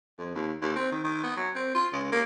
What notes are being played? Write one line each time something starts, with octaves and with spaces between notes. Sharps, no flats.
F2
D#2
D#2
C4
D#3
D#3
B3
F#3
C4
F4
C#2
A#3